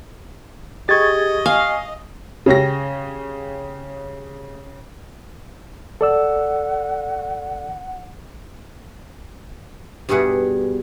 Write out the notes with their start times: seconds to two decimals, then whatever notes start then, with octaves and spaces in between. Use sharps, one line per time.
0.89 G4 G#4 D#5 C#6 G#6 A6
1.46 F5 G#5
2.46 C#3 C#4 G4 A#6
6.01 A4 D5 F#5 E6
10.09 G2 B2 G3 G#4 F#5